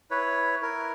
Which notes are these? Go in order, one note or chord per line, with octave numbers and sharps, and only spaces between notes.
E4 B4 C#5
E4 A#4